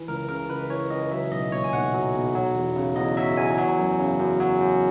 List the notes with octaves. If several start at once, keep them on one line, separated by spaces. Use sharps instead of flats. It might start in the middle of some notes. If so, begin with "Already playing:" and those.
Already playing: E3
C#2 A#4
C#3 A#4
C#2 B4
E3 C#5
C#2 D#5
F#3 E5
B1 D#5
A#2 C#5
G#5
B1 F#5
F#3
B1
F#3
E2
C#3
E2 D#5
F#3 E5
E2 G#5
F#3
F#2
C#3
F#2
F#3
F#2